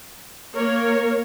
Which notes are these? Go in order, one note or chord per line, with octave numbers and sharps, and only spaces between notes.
A#3 A#4 C#5